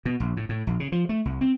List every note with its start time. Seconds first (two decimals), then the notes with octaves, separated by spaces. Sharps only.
0.05 B2
0.20 A#1
0.37 A2
0.49 A2
0.67 A#1
0.80 C#3
0.92 F3
1.09 A3
1.25 C2
1.41 C4